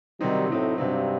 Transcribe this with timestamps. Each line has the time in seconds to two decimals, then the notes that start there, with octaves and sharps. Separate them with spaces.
0.20 C3 D#3 F#3 G3 C4 D#4
0.48 A2 C3 F#3 C4 D#4
0.77 G2 C3 F#3 C4 D#4